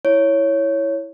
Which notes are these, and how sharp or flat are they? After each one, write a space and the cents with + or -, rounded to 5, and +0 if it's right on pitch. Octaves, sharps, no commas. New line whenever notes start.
E4 +0 C#5 +0